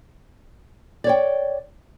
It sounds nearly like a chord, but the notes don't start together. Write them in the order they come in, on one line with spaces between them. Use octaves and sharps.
D5 C#5 G5